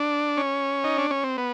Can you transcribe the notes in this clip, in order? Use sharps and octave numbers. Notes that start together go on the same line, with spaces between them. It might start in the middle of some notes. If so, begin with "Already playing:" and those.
Already playing: D4
C#4
D#4
D4
C#4
C4
B3